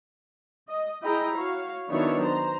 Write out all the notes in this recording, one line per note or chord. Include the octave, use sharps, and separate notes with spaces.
D#5
E4 G#4 D#5 G5 A#5
F#4 C#5 F5
D#3 F#3 B3 D4 E4 C#5
C5 A#5